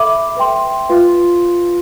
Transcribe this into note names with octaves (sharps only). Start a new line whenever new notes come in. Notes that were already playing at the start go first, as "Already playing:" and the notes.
Already playing: A4 E5 B5 D6
B4 E5 G5 C6
F4 B4 F5 C6